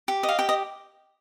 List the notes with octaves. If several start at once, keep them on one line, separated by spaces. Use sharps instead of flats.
G4
D#5
F5
G4 G5
D#5